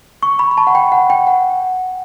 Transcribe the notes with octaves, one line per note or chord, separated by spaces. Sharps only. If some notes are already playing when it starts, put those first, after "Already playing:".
C#6
B5
B5
A5
F#5
G5
F#5
G5
F#5